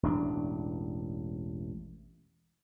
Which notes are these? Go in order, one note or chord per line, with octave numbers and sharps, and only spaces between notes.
E1 A1 D4